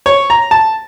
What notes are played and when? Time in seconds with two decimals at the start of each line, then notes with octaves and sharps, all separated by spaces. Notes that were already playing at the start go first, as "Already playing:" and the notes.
0.06 C#5
0.30 A#5
0.51 A5